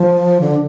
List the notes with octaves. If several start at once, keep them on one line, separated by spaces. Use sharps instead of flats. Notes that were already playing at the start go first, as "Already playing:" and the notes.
Already playing: F3
D3